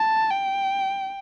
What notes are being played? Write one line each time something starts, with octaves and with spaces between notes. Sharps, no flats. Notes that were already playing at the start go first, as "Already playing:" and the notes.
Already playing: A5
G5